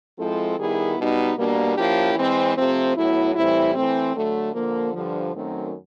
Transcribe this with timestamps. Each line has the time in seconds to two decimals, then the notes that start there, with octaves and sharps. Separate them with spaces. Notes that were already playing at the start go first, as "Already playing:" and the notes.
0.17 F3 G#3 C4 E4 A4
0.57 D#3 G3 B3 E4 G#4
0.97 B2 G3 B3 D#4
1.35 B2 G3 A#3 D4
1.75 F3 A#3 C#4 E4 G4
2.15 E3 G#3 C4
2.54 C3 F3 A3 C4
2.94 A2 F#3 B3 E4
3.34 A2 E3 G3 C4 E4
3.74 E3 A3 C4
4.14 D3 F#3 A3
4.54 D3 F3 A#3
4.93 G2 D3 F3
5.33 F#2 D#3 F#3 A3 C4